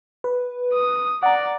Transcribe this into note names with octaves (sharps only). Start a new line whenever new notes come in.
B4
D#6
D5 F#5 A#5